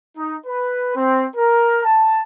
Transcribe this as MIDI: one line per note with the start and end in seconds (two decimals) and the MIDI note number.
0.17 0.35 63
0.47 0.94 71
0.96 1.26 60
1.35 1.84 70
1.85 2.22 81